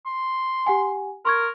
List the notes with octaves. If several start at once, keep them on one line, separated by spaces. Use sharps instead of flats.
C6
G4 F#5 G#5
A#4 C6 C#6 G#6